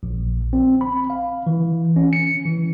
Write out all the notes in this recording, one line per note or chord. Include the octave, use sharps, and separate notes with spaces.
A#1
C4
B5
F5
E3
C#4
C#7
E3